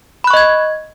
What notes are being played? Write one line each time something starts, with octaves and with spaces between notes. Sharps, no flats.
D#5 B5 C#6 F#6 G#6